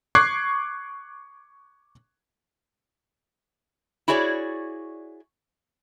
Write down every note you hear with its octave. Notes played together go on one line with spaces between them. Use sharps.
C#6 D6 F#6 G#6 C7
E4 F#4 G#4 C#5 D5